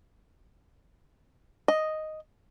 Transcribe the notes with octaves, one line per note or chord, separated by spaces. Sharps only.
D#5